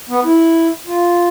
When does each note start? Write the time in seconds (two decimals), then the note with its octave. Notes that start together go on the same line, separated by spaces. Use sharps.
0.10 B3
0.24 E4
0.87 F4